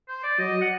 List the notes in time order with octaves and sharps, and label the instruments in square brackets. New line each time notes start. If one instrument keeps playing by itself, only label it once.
[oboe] C5
D5
[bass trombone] F#3 [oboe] D#5
[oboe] F#5